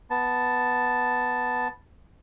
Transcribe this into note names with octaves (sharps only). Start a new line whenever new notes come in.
B3 A5